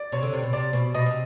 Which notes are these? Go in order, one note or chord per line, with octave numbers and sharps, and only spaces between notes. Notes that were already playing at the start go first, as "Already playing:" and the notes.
Already playing: D5
C3 C#5
D3
C3
B2
C3 D5
B2
B2 D#5
C3